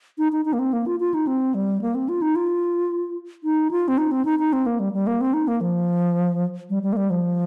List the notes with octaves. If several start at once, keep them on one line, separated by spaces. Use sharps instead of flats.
D#4
D#4
D#4
A#3
C4
A#3
F4
F4
D#4
C4
G3
A#3
C4
F4
D#4
F4
D#4
F4
C4
D#4
C4
D#4
D#4
C4
A#3
G3
G3
A#3
C4
D#4
A#3
F3
G3
G3
A#3
G3
F3